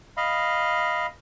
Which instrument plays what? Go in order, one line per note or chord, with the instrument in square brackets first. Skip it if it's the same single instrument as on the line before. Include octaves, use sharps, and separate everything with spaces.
[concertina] D#5 F5 B5